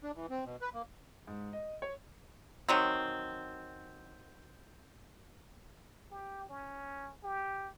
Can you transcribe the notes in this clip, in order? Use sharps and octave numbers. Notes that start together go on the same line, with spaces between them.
D4
E3
C4
B2
B4
A#3
G#2
D#5
C#5
D#3 F#3 C4
G4
C#4
G4